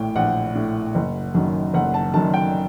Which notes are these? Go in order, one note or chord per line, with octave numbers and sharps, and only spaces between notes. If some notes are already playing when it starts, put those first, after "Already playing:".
Already playing: A#1 A2 G5
A#1 F#5
A2
F#1
F#2 D#3
F#1 F#5
A5
F#2 D#3 A5
G5